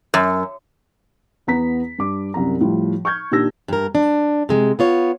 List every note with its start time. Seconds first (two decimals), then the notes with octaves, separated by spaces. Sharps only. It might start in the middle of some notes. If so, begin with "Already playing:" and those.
0.14 F#2
1.47 E2 B3 A#5 B6
1.99 G2 D6
2.34 C2 F#2 A#5
2.61 A2 F3 G3
3.05 C#6 F6 G6 G#6
3.31 A#2 D#3 D4 G4 E6 A#6
3.68 G2 A#4
3.95 D4
4.49 C3 G#3
4.79 B3 F4 C#5